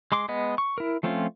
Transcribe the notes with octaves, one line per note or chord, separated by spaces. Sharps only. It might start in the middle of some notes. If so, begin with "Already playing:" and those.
G#3 C6 D6
G#3 B3 D#5
C#6
E4 A#4
F3 A3 C4 C#4 F4